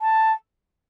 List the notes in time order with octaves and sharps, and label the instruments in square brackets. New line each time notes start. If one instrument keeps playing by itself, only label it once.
[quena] A5